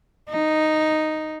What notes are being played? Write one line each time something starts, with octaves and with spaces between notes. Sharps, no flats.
D#4